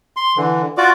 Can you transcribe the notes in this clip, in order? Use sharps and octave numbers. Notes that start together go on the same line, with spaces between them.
C6
D3 E3
F4 F#4 D5 D6